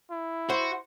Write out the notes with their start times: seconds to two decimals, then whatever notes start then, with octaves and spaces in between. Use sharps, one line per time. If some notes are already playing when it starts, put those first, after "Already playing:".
0.11 E4
0.50 F#4 C5